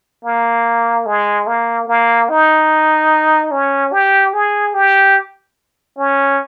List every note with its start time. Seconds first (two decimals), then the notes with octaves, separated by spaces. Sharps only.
0.25 A#3
1.06 G#3
1.47 A#3
1.88 A#3
2.29 D#4
3.51 C#4
3.92 G4
4.33 G#4
4.74 G4
5.97 C#4